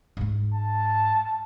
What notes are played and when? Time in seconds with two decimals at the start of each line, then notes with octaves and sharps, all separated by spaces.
0.17 G#2 G#3
0.54 A5